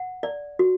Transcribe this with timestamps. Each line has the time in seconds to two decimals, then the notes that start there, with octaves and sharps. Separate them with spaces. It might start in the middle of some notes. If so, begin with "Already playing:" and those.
Already playing: F#5
0.23 D5
0.59 F#4